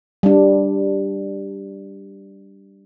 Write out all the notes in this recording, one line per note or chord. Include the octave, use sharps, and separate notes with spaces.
G3 D4